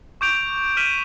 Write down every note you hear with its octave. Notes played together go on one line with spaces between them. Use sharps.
C#6 D6 G6 D7 F7
F6 B6 D#7 E7 F#7